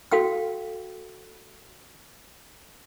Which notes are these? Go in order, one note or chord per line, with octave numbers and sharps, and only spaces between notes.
F#4 A4 F5 G5 E6